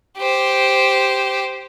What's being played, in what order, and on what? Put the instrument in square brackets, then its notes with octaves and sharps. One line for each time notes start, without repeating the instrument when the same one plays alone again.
[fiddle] G4 C5